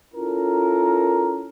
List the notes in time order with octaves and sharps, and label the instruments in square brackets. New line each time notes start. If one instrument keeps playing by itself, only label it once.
[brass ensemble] C#4 E4 F4 A4 A#4